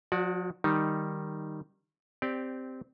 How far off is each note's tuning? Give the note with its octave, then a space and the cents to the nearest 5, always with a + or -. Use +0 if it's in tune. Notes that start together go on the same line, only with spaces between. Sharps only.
F3 +45 F#4 +0 D5 +0
D#3 -5 G3 +0 D#4 +0
C4 -15 G4 +5 D5 +0